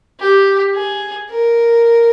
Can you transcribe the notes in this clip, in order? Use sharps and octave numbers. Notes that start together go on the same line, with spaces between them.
G4
G#4
A#4